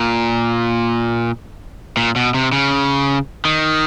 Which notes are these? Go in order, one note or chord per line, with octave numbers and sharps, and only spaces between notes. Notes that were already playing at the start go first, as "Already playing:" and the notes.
Already playing: A#2
A#2
B2
C3
C#3
D#3